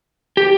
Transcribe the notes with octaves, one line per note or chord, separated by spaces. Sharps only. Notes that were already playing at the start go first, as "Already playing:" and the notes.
G4